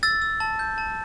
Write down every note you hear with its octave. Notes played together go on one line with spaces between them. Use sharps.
E6 A6
E6
A5
G6
A5